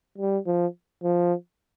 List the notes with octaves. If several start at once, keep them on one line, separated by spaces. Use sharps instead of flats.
G3
F3
F3